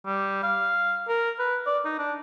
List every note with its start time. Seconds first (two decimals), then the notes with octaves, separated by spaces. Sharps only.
0.06 G3
0.43 F5
1.08 A#4
1.39 B4
1.67 D5
1.85 D#4
1.99 D4